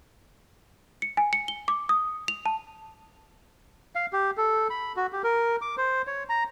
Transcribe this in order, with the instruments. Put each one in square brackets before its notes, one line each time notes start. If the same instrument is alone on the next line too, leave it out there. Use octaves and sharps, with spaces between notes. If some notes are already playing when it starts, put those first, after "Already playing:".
[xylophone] C#7
G#5
C#7
G7
D6
D#6
F7
A5
[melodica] F5
G4
A4
B5
F#4
G4
A#4
D6
C5
C#5
A#5